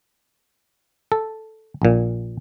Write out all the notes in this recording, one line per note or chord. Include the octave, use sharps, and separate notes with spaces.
A4
A#1 A#2